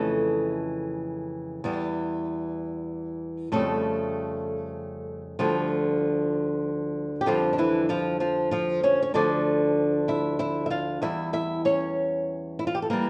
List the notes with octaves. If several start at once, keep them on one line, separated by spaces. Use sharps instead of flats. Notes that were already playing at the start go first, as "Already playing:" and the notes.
Already playing: F2 C#3 E3 A3 A4
E2 E3 G3
F2 C#3 G3 A3 A4
D2 D3 F3 G3 F4
G4
F2 D3 F3 G3 F4
D4
E3 E4
F3 F4
F3 F4
F3 F4
C#4 C#5
C#5
D2 D3 F3 D4 D5
E4 E5
E4 E5
E5
F4 F5
E2 E3 G3 E4 E5
E4 E5
C#4 C#5
E4
F4
G4
A4
E3 G3 A#3 A#4